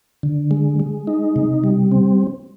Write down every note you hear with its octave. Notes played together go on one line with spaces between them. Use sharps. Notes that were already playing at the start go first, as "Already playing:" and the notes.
D3
G#3
G#3
D#4
C3
G3
C4